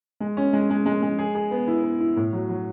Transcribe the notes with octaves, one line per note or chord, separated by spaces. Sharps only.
G#3
C#4
G#3
G#3
G#3
G#3
G#4
G#4
B3
E4
B3
E4
A2
F#3
F#3